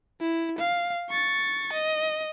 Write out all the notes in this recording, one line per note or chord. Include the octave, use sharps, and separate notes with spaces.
E4
F5
C#6 A6
D#5